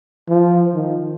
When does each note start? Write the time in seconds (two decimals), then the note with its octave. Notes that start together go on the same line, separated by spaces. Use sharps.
0.29 F3
0.74 D#3